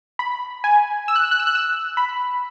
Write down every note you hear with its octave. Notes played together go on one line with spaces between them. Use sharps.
B5
G#5
E6
F#6
E6
F#6
E6
F#6
E6
B5